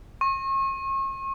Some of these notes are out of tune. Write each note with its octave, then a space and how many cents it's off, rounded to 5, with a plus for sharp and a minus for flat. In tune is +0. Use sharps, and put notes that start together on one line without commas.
C#6 -40